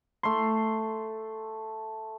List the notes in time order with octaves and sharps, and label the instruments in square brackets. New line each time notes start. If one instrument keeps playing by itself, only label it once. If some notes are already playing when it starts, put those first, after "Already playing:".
[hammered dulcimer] A3 C6